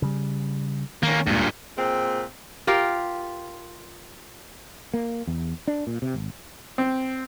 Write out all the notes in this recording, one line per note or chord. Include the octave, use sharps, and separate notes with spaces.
C#3 G3
D#3 A#3 C#4
D1 G2 A#2 G#3 A#3
A#2 G#3 C4
F4 G4 A#4 F5
A#3
E2
D4
A#2
C3
G#1
C4